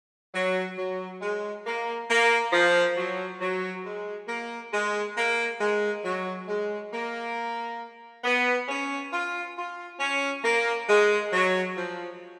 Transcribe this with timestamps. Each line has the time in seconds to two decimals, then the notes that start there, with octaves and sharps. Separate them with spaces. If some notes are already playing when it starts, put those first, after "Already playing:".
0.33 F#3
0.77 F#3
1.21 G#3
1.65 A#3
2.09 A#3
2.52 F3
2.96 F#3
3.40 F#3
3.85 G#3
4.28 A#3
4.72 G#3
5.16 A#3
5.60 G#3
6.04 F#3
6.48 G#3
6.92 A#3
8.24 B3
8.68 C#4
9.12 F4
9.56 F4
9.99 C#4
10.43 A#3
10.88 G#3
11.31 F#3
11.76 F3